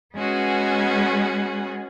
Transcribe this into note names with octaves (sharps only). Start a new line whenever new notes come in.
G#3 B3 C#4 F#4 G#4